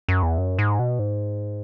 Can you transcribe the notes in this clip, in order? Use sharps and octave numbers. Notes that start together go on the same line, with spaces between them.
F#2
E2
F#2
G#2
B2
G#2